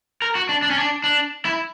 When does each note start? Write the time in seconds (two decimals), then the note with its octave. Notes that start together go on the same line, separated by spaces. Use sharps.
0.22 A#4
0.35 F#4
0.49 D4
0.62 D4
0.71 C#4
0.78 D4
1.04 D4
1.45 E4